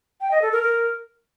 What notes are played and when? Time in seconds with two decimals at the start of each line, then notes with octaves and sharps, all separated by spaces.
0.21 G5
0.31 D#5
0.42 A4
0.52 A#4
0.63 A#4